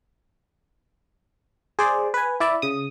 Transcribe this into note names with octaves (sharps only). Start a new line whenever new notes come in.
G#4 C5 D5
B4 G#5
E4 D5 E5 B5
C#3 D#6